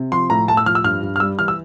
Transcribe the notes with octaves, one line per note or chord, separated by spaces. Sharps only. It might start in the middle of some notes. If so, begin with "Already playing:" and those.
Already playing: C3
F3 C6
A2 A#5
A2 A5
E6
F3 F6
E6
G2 F6
G2
F6
G3 E6
E3 F6
E6